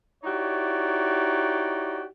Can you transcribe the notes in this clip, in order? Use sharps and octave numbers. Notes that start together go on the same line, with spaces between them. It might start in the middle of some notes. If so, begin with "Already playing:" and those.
D#4 E4 F#4 G4 C#5 D5